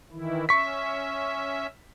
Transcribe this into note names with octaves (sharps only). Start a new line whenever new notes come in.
D#3 E3 E4
C#4 E5 C#6 B6